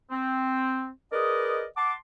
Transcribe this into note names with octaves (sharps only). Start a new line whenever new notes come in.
C4
G#4 A#4 B4 D5 D#5
F#5 A5 C6 D6